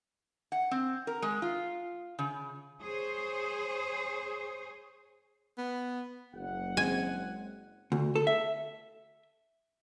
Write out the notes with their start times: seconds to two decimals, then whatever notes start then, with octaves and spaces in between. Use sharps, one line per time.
0.52 F#5
0.71 C4
1.07 A#4
1.22 G#3
1.42 F4
2.19 C#3
2.82 G#4 C5 C#5
5.58 B3
6.34 F#1 F#5
6.77 G#3 C4 G#5
7.92 D2
8.16 A4
8.27 E5